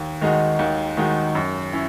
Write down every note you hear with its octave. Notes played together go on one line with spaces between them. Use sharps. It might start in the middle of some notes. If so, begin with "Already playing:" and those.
Already playing: D#2
D#3 G#3 D#4 F#4
D#2
D#3 G#3 D#4 F#4
F#2
C#4 E4